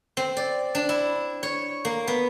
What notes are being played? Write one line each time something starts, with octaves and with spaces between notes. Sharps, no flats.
C4
D5
D4
E4
C#5
A#3
B3